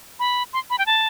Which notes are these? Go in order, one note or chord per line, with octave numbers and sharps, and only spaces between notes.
B5
C6
B5
G5
A5